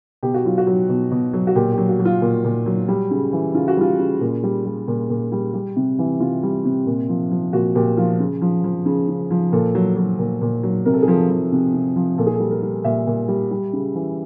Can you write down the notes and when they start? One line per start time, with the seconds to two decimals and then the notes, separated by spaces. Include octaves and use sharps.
0.23 B2 G4
0.34 F#4
0.45 F#3 F4
0.58 F#4
0.67 F#3
0.89 B2
1.11 B2
1.34 F#3
1.47 F#4
1.55 A#2 G4
1.72 G4
1.78 F#3
1.89 F#4
2.00 F#3
2.05 F4
2.22 A#2
2.44 A#2
2.66 F#3
2.88 G3
3.11 C#3
3.33 E3
3.54 C#3 F4
3.68 F#4
3.77 G3 F4
3.99 C#3
4.21 A#2
4.43 G3
4.65 G3
4.88 A#2
5.10 A#2
5.32 G3
5.54 G3
5.76 C3
5.99 E3
6.20 C3 F4
6.43 G3
6.65 C3
6.87 A#2
7.09 F3
7.31 F3
7.53 A#2 F#4
7.75 A#2 G4
7.97 F3 F4
8.20 C#3
8.42 F3
8.64 F3
8.86 C#3
9.08 C#3
9.31 F3
9.52 A#2 A4
9.75 F#3
9.97 F#3
10.19 A#2
10.41 A#2
10.63 F#3
10.85 C3 A#4
10.93 A4
11.02 G#4
11.08 F3 A4
11.30 F3
11.52 C3
11.74 C3
11.96 F3
12.18 A#2 A4
12.27 G#4
12.34 A4
12.40 G3
12.51 A#4
12.62 G3
12.84 A#2 E5
13.07 A#2
13.28 G3
13.51 G3
13.73 C#3
13.95 E3